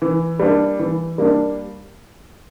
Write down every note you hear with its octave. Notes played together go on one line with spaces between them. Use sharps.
E3
G3 A#3 D4
E3
G3 A#3 D4